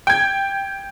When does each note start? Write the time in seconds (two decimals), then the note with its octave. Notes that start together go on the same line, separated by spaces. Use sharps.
0.07 G5 G#6